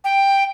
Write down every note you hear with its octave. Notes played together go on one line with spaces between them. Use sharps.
G5